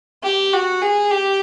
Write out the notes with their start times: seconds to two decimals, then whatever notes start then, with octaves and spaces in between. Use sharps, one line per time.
0.23 G4
0.53 F#4
0.82 G#4
1.11 G4